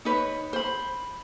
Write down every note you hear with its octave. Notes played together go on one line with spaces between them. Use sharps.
D#4 B4 C#5
C5 B5